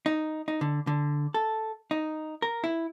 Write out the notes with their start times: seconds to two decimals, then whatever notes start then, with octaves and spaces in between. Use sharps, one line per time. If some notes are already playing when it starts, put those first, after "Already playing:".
0.06 D#4
0.48 D#4
0.61 D3
0.87 D3
1.34 A4
1.91 D#4
2.42 A#4
2.64 E4